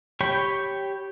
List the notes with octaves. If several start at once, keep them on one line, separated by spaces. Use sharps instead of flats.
G4 C#5 G5 B5 C#6